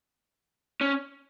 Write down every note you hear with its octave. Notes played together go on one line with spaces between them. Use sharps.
C#4